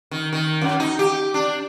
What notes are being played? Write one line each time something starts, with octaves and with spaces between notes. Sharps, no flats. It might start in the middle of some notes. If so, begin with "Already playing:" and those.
D#3
D#3
F#2
D#4
G4
D4